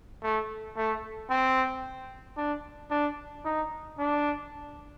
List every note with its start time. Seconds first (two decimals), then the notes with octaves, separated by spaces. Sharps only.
0.23 A3
0.77 A3
1.30 C4
2.37 D4
2.91 D4
3.45 D#4
3.99 D4